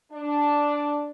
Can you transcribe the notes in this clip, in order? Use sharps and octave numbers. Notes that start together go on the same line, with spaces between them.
D4